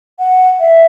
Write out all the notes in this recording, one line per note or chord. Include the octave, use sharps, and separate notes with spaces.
F#5
E5